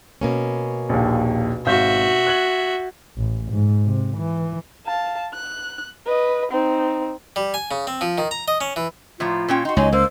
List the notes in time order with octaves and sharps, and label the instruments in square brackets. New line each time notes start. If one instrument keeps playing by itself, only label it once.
[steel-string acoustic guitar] B2 A#3 C#4
[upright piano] A#1 D#2
[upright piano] G#1 F5 G6 [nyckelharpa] F#4 E5
[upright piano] F#6 G#6 F#7
[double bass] A1
G#2
C3
E3
[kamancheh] F5 A5
F#6
B4 D#5
C4 D#4
[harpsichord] G3
G#5
C#3
C4
F3
D#3
A#5
D#5
C#4
E3
[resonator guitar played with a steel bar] A2 F3 A#5 [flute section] F4
[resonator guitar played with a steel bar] A#2 C#4 G5
[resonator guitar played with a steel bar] D#4 F#4 [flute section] C6
[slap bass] C#2 [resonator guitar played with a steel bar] F#3 D#4 [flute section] C#5 G#5 C6
[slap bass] C#2 [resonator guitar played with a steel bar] A#3 [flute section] C5 E6